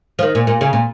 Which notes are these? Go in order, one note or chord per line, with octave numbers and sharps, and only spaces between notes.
F3
D#3
A#2
A#2
C#3
A#2